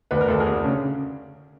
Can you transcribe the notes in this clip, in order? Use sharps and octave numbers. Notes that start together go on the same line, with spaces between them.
D2 B4
A#4
D2 A4
G#4 A#4
D2
C#3